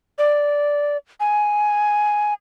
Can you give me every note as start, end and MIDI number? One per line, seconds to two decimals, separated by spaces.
0.18 0.97 74
1.20 2.34 80